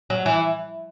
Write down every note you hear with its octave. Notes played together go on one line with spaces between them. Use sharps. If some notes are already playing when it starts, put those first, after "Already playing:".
F#3
E3